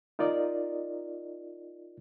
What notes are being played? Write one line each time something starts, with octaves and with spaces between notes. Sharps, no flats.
D#4 F4 A#4 D5 D#5